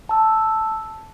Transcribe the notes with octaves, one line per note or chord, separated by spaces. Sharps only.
A5 E6